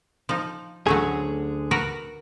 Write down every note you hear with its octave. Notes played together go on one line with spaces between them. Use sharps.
F3 D#4
D2 D3 F#3 A3 C#4 G#4
F#4 A#4 B4